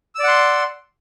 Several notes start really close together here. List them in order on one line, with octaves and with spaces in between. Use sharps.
E6 D5 F#5 C6